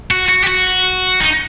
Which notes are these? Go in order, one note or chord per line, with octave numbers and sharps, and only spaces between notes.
F#4
F#4
G4
F#4
D#4